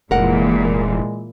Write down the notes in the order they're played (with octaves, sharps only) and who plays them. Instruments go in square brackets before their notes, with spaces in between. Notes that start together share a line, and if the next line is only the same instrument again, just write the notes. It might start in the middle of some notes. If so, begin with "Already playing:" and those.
[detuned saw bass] F1 [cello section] A#2 E3 [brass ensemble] G#3 [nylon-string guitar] A#4 F#5